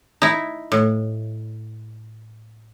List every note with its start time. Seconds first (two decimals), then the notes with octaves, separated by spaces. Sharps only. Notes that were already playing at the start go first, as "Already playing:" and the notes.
0.22 D#4 E4
0.72 A2